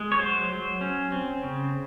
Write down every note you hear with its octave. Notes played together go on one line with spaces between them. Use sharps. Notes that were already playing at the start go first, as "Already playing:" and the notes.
Already playing: G#3
C#5
F#3 C5
F#3
C#4
C4
C#3